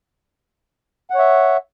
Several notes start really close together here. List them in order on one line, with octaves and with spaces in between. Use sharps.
F#5 C#5 E5